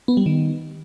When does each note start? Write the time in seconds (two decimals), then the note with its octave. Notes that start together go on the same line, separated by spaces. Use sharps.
0.08 B3
0.17 G3
0.26 D#3